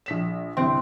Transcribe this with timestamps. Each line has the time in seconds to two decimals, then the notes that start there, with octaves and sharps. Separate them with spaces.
0.06 A#1 B6 E7
0.57 G1 C2 C4